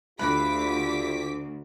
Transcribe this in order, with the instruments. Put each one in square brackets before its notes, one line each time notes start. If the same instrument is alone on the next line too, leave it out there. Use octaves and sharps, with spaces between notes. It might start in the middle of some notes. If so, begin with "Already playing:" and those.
[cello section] D2 [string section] D3 D6 B6 [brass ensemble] F4 G4 [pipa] B4